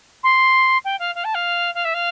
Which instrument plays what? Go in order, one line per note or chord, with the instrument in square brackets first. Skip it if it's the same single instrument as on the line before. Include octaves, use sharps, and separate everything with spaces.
[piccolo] C6
G5
F5
F5
A5
F5
F5
E5
F5